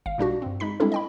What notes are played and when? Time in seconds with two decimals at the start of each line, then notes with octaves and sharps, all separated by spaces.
0.06 G#1 F5
0.18 A#2 G3 D4 F#4
0.42 G2 C4
0.60 G#3 D#4 B5 B6
0.80 G3 G#3 C4 D4 E4 A4
0.92 D#5 G5 B5